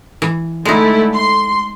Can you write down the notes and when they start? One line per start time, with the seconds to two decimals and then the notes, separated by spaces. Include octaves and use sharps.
0.22 E3
0.65 D3 G#3 A3 D#4 E4
1.14 C6